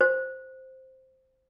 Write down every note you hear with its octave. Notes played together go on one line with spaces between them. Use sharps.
C5